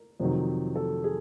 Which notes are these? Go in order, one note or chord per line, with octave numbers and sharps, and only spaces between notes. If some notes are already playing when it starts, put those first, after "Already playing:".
Already playing: A#4
F2 C3 D#3 F#3
A4
G#4